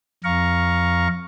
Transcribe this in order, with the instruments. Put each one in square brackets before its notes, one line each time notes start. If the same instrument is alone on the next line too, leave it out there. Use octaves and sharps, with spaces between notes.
[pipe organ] F2 F5 A#5 C#6